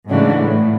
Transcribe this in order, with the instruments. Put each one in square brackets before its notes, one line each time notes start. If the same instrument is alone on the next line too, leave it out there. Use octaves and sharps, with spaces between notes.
[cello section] G#2 [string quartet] C#3 E3 A3 D4 F#4
[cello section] A2